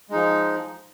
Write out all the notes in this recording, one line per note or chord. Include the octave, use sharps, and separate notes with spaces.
F3 G#3 D#4